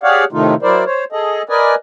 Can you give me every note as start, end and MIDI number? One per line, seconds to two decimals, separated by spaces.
0.03 0.24 67
0.03 0.24 68
0.03 0.24 73
0.03 0.24 74
0.03 0.24 77
0.03 0.24 78
0.32 0.55 45
0.32 0.55 48
0.32 0.55 51
0.32 0.55 57
0.32 0.55 63
0.32 0.55 65
0.62 0.84 54
0.62 0.84 64
0.62 0.84 70
0.62 0.84 72
0.62 0.84 74
0.85 1.04 72
0.85 1.04 73
1.12 1.42 68
1.12 1.42 69
1.12 1.42 75
1.49 1.75 70
1.49 1.75 71
1.49 1.75 74
1.49 1.75 75
1.49 1.75 80